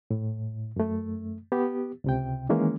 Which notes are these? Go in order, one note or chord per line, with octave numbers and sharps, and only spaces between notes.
A2
F#2 A3
B3 G4
C#2 C3 G5
D#3 E3 G#3 A#3 C#4